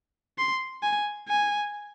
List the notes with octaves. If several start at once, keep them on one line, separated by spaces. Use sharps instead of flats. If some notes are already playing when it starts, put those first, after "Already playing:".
C6
G#5
G#5